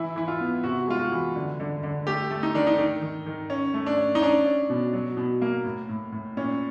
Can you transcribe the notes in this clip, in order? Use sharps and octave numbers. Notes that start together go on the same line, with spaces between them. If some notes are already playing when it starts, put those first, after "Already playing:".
Already playing: E3 E4
E3 E4
F4
B3
C3 F#4
G#3 F4
F#4
E3
D3
D3
D3
A3 G4
A3
D#4
D#3 D4
D#4
D#3
D#3
D#3
C#4
A3
D4
C#4
D#4
C#4 D4
C#4
B2
F#3
B2
A#3
A2
A2
A2
A#2 C#4